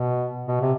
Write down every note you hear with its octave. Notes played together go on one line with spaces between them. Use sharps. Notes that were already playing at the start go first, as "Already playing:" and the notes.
Already playing: B2
B2
C3